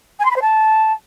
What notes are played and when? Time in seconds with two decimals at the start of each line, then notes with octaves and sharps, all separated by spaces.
0.19 G#5
0.25 C6
0.30 B5
0.36 C5
0.41 A5